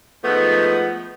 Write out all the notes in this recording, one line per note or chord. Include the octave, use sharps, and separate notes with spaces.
F3 G#3 A3 B3 D#4